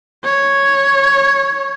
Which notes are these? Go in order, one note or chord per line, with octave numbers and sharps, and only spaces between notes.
C#5